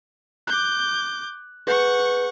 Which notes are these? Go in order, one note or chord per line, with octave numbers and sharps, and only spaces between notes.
D6 F#6 G6
G#4 B4 F#5 C#6 G6